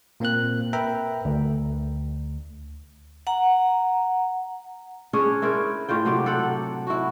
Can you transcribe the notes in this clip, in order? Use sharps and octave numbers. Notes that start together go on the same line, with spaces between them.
A#2 A#3 C4 A#4 F#6
A#4 B4 E5 G5 A#5
D2
F#5 A#5
C#4 D4 G#4 C#5
E4 A#4 C5 D5
A2 D4 F4 G5
C3 F#3 G4 D5
A4 F#5
E4 F#4